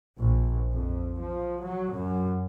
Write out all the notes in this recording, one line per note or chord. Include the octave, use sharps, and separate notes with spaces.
A#1
F2
F3
F#3
F#2